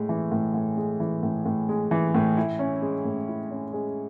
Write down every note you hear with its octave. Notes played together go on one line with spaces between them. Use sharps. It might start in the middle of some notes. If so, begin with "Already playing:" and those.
Already playing: A2 G#3
E3
A2
A2
G#3
E3
A2
A2
G#3
E3
A2
E4
C#4
G#3
A2
E4
C#4
G#3